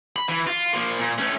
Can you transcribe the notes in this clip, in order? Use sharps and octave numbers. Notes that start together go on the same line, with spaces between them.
B5
E3
F4
F3 A#3
A#2
A3 C#4